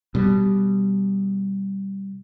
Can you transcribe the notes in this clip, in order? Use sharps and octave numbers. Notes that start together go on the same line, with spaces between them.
B2 G3